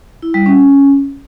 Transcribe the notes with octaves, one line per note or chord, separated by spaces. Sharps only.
E4
G3
C#4